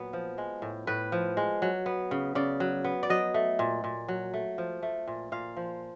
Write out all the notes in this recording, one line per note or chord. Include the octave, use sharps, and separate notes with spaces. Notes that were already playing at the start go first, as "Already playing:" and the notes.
Already playing: A#2 F#3 B3
F3
G#3
A2
A2 B4
F3
G#3
F#3
B3
C#3
C#3 D5
F#3
B3
D5
F#3 D#5
A3
A#2
A#2
F#3
A3
F3
A3
A#2
A#2 F5
F3